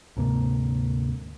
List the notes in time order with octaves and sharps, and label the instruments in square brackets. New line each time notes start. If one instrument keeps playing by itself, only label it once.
[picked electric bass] D2 G#2 C3 A#3